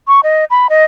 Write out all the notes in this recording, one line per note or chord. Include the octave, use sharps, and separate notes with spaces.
C#6
D#5
B5
D#5